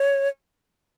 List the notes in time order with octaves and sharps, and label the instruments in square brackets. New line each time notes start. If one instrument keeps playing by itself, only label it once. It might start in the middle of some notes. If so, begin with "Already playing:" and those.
Already playing: [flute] C#5